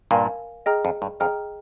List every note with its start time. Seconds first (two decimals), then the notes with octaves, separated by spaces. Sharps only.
0.11 G2 A#2 A#4 F5 G#5
0.66 G#4 D#5 G5 A#5 F6
0.85 F2
1.02 G2
1.20 F2 G#4 D#5 G5 A#5 F6